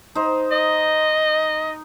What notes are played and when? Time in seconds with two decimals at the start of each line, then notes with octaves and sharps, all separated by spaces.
0.15 D#4 C5
0.51 D#5